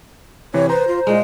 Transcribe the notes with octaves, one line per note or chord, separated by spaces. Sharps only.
C3 E3 C#5
B4 C5 A#5
F4
A#2 G#3 D#5